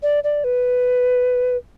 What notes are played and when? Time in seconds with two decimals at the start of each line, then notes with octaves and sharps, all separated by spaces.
0.02 D5
0.24 D5
0.44 B4